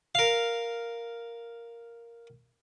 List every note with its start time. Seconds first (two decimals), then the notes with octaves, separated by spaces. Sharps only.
0.15 A#4 F5